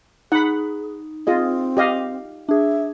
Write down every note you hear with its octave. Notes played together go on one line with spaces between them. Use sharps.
D#4 G#4 F#5 B5
C4 F4 G#4 D#5
G4 D#5 F5
D4 G#4 E5